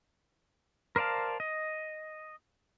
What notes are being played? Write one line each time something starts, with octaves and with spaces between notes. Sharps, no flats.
A#4 C5 D5 F5 A5
D#5